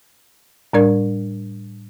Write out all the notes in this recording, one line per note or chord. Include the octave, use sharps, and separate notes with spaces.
A2 G3 D4 A#4 D5 G#6